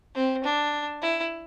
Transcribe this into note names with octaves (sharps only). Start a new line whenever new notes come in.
C4
D4
E4